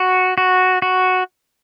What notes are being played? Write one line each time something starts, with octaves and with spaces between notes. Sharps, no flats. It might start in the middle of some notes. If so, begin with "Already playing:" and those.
Already playing: F#4
F#4
F#4